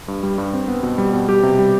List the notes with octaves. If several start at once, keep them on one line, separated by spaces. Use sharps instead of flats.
G2
G3
G2
C4
B3
B2
G3
B2
G3 G4
C3
G3